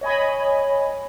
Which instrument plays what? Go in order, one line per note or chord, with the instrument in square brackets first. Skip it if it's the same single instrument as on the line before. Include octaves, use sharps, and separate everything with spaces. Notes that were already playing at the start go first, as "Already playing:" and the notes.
[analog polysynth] C#5 D#5 G#5 B5